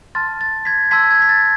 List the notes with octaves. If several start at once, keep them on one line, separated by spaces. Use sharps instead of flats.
A5 C6 F6 A6
A6
G#6 B6
A5 C6 E6 G#6 B6
G#6
B6
A6